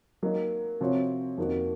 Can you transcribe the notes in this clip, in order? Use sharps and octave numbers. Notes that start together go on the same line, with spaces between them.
F#3 A#3 D#4
C3 F3 C4 F#4 C#5
F2 D#3 A#3 D#4 F#4